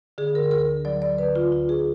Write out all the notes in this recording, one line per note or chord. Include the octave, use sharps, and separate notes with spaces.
D3 G#4
A#4
D2 A#4
F#3 D5
D5
D3 B4
F4
D2 F4
G#4